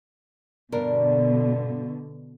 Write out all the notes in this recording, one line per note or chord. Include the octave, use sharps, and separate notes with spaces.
G2 B2 D3 D4 A#4